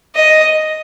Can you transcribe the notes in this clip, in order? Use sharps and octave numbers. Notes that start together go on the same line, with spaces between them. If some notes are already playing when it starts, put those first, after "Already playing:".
D#5